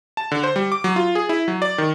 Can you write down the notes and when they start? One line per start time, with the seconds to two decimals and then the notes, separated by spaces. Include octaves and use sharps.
0.17 A5
0.32 D3
0.43 C5
0.56 G3
0.72 D6
0.84 F#3
0.96 F4
1.15 G#4
1.29 E4
1.48 F#3
1.62 D5
1.78 D#3